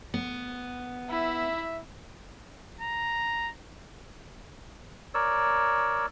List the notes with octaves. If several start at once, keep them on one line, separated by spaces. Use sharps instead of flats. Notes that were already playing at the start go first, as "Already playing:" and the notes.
B3
E4 E5
A#5
A#4 C#5 D5 E6